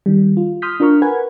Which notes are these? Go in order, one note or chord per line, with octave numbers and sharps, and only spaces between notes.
D#3 G3
F4
C6 D#6 F6 G6 B6
D4 F4 A#4 A#5 C#6 F6
A#4 B4 F#5 G#5 B5 G#6